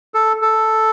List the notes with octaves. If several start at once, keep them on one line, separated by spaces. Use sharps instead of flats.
A4
A4